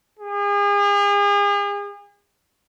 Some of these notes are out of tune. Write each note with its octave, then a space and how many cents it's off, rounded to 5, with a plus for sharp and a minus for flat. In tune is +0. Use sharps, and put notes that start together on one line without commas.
G#4 -40